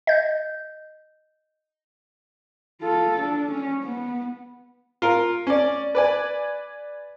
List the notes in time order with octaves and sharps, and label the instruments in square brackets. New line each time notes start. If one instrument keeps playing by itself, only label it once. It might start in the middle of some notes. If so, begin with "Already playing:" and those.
[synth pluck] D#5 G6
[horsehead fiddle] F4 A4
D4
C#4
B3
[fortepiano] F4 A#4
C#4 D5
B4 D5 G#5